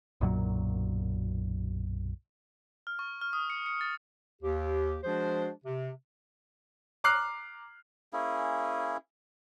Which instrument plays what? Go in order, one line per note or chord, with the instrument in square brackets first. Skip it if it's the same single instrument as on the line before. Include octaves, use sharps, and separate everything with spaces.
[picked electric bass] B1 F#2 A#2 F#3
[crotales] F6
C#6
F6
D#6
C#7
C#7
A6
[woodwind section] D#2 G4
F3 G#3 D4 F#4 G#4 C5
C3
[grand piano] A#5 D6 F6 F#6 C7
[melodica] A#3 C#4 E4 G#4